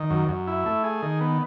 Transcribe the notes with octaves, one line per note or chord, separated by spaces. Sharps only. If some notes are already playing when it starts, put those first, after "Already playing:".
Already playing: D#3
F#2
F#2
E4
A3
G#4
D#3
B3